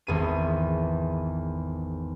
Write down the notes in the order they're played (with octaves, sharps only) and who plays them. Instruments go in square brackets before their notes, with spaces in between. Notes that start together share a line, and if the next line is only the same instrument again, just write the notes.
[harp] G#1 E2 D#7